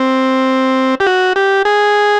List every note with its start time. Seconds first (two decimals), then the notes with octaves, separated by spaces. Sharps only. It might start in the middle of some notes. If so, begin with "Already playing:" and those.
Already playing: C4
1.00 G4
1.07 F#4
1.36 G4
1.65 G#4